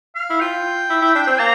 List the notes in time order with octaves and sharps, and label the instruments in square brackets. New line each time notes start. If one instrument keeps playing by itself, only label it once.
[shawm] F5
[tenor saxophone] E4
[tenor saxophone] F4 [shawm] G5
[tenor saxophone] E4
E4
D4
C4
[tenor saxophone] A#3 [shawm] A#5